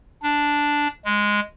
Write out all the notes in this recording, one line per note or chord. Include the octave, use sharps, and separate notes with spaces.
D4
G#3